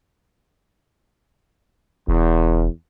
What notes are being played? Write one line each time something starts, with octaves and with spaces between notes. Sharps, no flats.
E1 E2